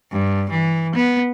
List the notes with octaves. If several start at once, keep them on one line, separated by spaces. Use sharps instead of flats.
G2
E3
B3